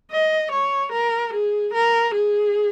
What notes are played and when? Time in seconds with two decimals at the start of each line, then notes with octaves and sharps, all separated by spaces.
0.12 D#5
0.52 C#5
0.92 A#4
1.34 G#4
1.74 A#4
2.15 G#4